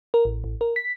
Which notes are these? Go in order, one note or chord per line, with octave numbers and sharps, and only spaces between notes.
A#4
A1
A1
A#4
B6